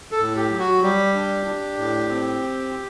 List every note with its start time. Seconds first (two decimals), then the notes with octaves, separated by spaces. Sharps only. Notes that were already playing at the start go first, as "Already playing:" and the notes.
0.12 A4
0.20 A2
0.36 G4
0.51 F#3
0.59 F#4
0.82 G3 G4
1.15 D4
1.46 D4
1.77 A2
2.08 C4